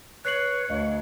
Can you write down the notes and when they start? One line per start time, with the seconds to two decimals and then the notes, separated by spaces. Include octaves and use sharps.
0.25 B4 C#5 F#6 C7 F#7
0.70 D2 D#5 F5